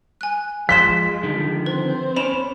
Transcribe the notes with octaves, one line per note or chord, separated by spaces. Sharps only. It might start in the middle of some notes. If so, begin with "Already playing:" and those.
G#5 F#6
F3 G#3 F5 C6 B6 E7
D3 D#3 F3
C4 B4 C5
C#4 C#5 D5 B5 E7 F7